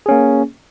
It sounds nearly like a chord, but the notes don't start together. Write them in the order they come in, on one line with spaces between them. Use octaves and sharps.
G#4 C#4 A#3